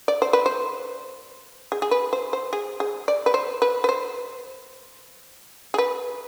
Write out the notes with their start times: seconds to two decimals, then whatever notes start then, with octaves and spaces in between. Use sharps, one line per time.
0.08 D5
0.22 C5
0.33 B4
0.46 C5
1.72 G#4
1.82 G#4
1.91 B4
2.13 C5
2.33 C5
2.53 G#4
2.80 G#4
3.08 D5
3.26 B4
3.34 C5
3.62 B4
3.84 B4
3.89 C5
5.74 G#4
5.78 B4